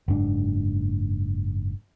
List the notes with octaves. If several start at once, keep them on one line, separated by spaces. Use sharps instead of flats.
F#1 G#2 D4